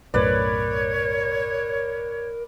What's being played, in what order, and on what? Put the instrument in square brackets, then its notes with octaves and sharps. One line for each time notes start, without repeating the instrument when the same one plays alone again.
[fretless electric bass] B1 F#2 A2 [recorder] A#4 [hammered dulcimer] B4 D5 [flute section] C#5